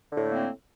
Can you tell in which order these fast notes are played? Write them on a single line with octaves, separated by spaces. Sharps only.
D3 A2 A3 A#3 C4